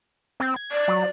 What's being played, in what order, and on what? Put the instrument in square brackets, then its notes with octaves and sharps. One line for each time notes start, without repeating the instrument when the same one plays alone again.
[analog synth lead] C4
G#6
[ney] D5
[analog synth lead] F#3